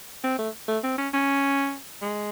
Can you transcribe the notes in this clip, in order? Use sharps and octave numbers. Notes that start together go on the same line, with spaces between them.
C4
A3
A3
C4
C#4
C#4
G#3